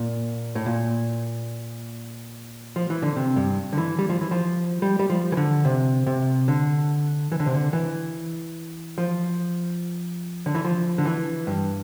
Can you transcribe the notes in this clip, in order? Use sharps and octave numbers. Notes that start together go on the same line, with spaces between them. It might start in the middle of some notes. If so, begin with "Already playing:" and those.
Already playing: A#2
A2
A#2
F3
E3
D3
C3
G2
D3
E3
G3
F3
E3
F3
G3
G3
F3
E3
D3
C3
C3
D3
E3
D3
C3
D3
E3
F3
D3
E3
F3
D3
E3
G2